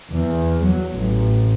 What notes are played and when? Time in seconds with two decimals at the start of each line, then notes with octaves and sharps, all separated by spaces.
0.11 E2
0.64 F#3
0.96 A1